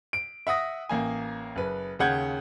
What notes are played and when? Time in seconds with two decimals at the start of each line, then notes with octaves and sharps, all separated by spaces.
0.13 D7
0.47 E5 F#5 D#6 A#6
0.89 A1 A#3 G#5
1.56 F#1 B4
1.99 D#2 C#3 F#5 G6 G#6